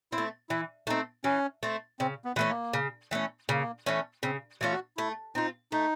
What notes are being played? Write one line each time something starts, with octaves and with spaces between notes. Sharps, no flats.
C4 E4
A3
E3 E4
A3 C4 D#4
E3 C#4
A3 C4
C#3 C4
B3
E3 A3 C#4
A#3
C#3
E3 A3 C#4
C#3 A#3
E3 A3 C#4
C#3 C4
E3 A3 C#4 F4
F#4
A3 E4
C4 D#4 F4
A3 D#4